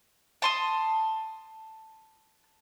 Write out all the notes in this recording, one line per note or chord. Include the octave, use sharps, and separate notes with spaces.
A5 C6 D#6